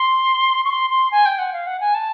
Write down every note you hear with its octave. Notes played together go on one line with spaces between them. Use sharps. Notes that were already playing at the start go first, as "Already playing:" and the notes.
Already playing: C6
C#6
C6
C6
G#5
G5
F#5
F5
F#5
G#5
A5